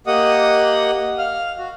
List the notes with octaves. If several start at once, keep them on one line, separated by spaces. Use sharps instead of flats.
A#3 G4 D#5 F#5 D#6
F5 F6
F#4